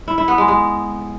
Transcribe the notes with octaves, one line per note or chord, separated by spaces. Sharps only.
E4
E4
B3
G#3
G#3